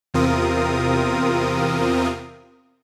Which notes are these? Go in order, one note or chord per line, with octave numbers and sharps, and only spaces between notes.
E2 C3 C4 F4 A#4 D#6